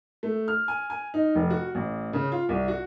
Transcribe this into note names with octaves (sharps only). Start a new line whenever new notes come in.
A3
F6
G#5
G#5
D#4
F1
F#4
A1
C#3
F4
C2
F#4